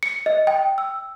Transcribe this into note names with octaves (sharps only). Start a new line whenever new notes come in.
C#7
D#5
G5
E6